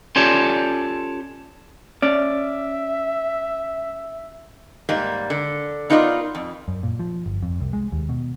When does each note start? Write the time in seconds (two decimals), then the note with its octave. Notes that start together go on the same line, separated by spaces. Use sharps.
0.16 C#4 F4 G4 A4 C#5 D5
2.02 C#4 D5 E5
4.89 G#2 G3 A#3
5.30 D3
5.90 B3 D#4 F4 A#4 D5
6.35 F2
6.68 F#2
6.83 A#2
6.99 F3
7.26 G1
7.42 F2
7.61 C2
7.73 G#3
7.92 D#2
8.09 B2